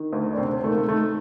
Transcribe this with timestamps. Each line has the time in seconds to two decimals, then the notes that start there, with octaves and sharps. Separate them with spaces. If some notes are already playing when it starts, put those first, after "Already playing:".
Already playing: D#3
0.13 D2
0.33 D4
0.38 C3 C4
0.64 D#3 A3
0.70 A#3
0.78 A3
0.89 D#3 A3